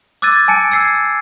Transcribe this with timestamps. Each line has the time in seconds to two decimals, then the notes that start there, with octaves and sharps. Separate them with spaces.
0.22 D6 E6 F#6 G#6 A6 D#7
0.48 G#5 A5 C#7 D7
0.71 E6 G#6 C7